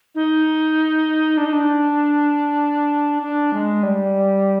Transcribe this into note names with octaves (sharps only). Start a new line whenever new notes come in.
D#4
D4
D#4
D4
D4
G#3
G3